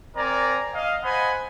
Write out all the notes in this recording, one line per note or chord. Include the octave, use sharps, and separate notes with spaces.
C4 A#4 D5 G#5 A#5
D#5 F5
C5 D#5 F#5 G#5 B5